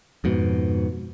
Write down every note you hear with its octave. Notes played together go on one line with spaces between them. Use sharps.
F2 G#2 B2